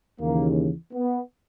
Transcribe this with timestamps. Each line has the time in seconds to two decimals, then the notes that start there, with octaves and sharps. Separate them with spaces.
0.20 D#2 C#3 E3 A#3
0.93 B3